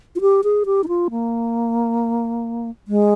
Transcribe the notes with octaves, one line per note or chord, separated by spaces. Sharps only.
F4
G4
G#4
G4
D#4
F4
A#3
G#3